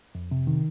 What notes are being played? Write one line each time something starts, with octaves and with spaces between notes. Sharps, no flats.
F2
C3
D#3